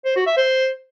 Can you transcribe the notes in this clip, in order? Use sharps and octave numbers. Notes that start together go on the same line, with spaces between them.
C5
F#4
E5
C5